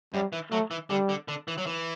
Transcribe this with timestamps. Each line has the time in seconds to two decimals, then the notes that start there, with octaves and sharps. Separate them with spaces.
0.14 F#2 G3
0.33 E3
0.51 F#3 A3
0.71 E3
0.90 D3 G3
1.09 D3
1.28 D3
1.48 E3
1.58 F#3
1.67 E3